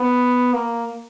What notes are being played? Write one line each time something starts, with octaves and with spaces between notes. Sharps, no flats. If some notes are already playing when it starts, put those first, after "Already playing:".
Already playing: B3
A#3